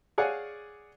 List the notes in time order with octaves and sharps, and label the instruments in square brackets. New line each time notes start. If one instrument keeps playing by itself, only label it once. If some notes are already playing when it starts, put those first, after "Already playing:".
[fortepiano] G#4 C#5 D5 F5 F#5 G#5